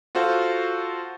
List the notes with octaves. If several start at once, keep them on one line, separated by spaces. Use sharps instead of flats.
F4 F#4 A4 C5 F5